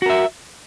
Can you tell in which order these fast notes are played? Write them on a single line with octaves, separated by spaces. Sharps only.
F#4 A#4 E5